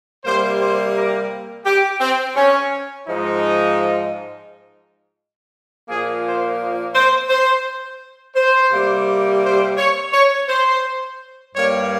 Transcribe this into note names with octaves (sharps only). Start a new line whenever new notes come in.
C3 G3 A#3 C5
C5
A#4
G4
C4
C#4
G#2 F3 G#3 D#4
A#2 F3 A#3 G#4
C5
C5
C5
C5
C3 G3 A#3
C5
C#5
C#5
C5
G2 G3 A#3 C#5